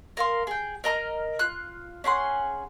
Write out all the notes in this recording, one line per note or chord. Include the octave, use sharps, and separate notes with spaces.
A#4 F5 C6
G#4 G5
A#4 D#5 A#5 F6
F4 F#6
C#4 G#4 F#5 C6